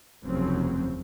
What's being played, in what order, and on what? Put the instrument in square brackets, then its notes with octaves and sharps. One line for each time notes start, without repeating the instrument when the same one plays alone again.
[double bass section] F1 D#2 C#3 F3 F#3 C4